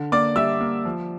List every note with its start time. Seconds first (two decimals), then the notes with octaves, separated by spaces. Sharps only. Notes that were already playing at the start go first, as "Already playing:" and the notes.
Already playing: D3
0.12 A#3 D5 D6
0.36 G3 E5 E6
0.61 A#3
0.85 F3